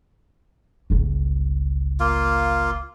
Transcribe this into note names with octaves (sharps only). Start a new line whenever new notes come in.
G1 C#2
A#3 F4